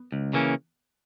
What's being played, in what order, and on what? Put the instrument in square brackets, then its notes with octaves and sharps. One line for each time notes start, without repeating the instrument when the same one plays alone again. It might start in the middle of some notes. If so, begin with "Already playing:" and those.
Already playing: [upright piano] B3
[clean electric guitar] C#2
C#3 E3 A#3 C#4